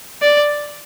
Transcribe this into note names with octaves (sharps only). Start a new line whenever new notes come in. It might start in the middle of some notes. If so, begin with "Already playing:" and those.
D5